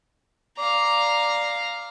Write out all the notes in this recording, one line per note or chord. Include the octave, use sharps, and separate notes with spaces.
D5 F5 A#5